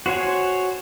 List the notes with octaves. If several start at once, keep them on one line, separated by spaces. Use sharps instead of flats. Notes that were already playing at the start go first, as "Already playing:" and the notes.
F#4 C5 C#5 G#5